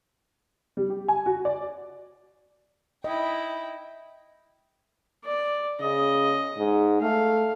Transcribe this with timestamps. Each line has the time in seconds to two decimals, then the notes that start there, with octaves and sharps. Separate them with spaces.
0.77 G3
0.90 G4
1.08 G#5
1.26 F#4
1.45 D5
3.04 E4 D#5 G5
5.24 D5
5.80 C#3 D#5
6.58 G#2
7.02 A3 F5